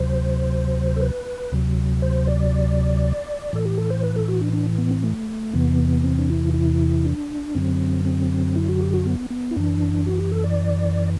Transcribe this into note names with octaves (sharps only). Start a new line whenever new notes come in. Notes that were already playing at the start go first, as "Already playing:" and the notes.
Already playing: D2 C3 F#3 C5
A4
B4
D2 C3 F#3
C5
D5
A2 E3 A4
G4
A4
C5
B4
A4
F#4
D4
D4
B3
C4
A3
E2 C3 E3 B3
C4
D4
E4
E4
D4
F#2 D3 F#3 C4
C4
E4
F#4
G4
F#4
B3
B3
E4
F#2 E3 D4
F#4
G4
A4
D5